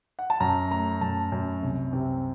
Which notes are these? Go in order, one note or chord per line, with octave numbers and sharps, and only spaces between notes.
F#5
A5
F#2 A#5
A3 A#5
F#2 A5
F#2
C2
C3